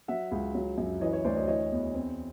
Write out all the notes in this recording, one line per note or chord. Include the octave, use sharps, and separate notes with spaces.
F#3 E5 F#5
C#2
F#3
F#2
E3 C#5 D#5
C#5
D2 C5 D5
C#5 D#5
E3 C#5 D#5
E2
C4